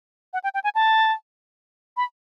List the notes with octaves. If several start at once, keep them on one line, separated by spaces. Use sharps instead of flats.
F#5
G5
G5
G#5
A5
B5